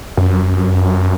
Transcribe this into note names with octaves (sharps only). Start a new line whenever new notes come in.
F#2